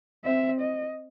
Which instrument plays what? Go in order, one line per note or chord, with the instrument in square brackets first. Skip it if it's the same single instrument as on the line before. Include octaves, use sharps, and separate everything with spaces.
[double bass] C4 [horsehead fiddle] E5
[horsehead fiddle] D#5